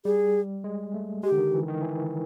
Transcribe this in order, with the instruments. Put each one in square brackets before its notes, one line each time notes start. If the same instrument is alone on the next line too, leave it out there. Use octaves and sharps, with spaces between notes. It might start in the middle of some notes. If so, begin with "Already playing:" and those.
[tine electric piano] G3 [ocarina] G#4
[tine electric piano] G#3
A3
[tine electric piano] G#3 [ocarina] G4
[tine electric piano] D3
D#3
E3
D#3
E3